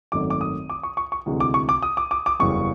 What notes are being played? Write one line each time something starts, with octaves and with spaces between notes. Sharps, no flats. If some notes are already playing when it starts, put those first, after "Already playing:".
G#1 F#2 D#3 F#3 A3 D6
D6
D#6
D6
C#6
C#6
C#6
D2 C3 E3 G#3
D6
C#6
D6
D#6
D6
D6
D6
F#1 E2 C#3 E3 G3 C#6